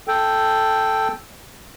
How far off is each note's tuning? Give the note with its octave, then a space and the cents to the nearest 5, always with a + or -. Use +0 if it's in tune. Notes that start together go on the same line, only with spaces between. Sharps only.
A4 +0 G5 +0